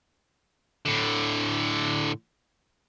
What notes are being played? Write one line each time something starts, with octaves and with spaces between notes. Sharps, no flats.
A2 D3